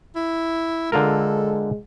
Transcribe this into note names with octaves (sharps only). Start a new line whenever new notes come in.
E4
D3 G#3 F4 A4 A#4